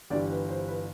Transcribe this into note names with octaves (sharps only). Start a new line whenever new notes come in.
G1 G2 E3 G3 D5
B4
C5
B4